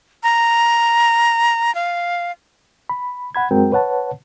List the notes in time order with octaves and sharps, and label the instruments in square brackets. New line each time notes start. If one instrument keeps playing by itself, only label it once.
[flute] A#5
F5
[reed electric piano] B5
F#5 B5 G#6
F#2 G#3 C4 F#4 A#4 G5
B4 C#5 F#5 A5